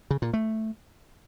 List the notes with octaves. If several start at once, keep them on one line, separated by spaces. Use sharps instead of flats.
C#3
A#2
A3